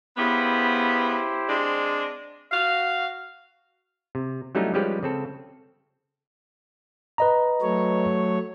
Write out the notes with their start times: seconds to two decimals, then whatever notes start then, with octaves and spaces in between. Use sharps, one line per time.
0.17 C#3 B3 E4 G4 C5
1.49 G#3 C4 D4
2.52 F#4 F5
4.15 C3
4.55 F#3 G3 A3 C#4 D#4 E4
4.74 F3 G3 G#3 C#4 G4 B4
5.03 C#3 C4 A4
7.18 B4 D#5 A#5
7.62 F#3 A3 C#5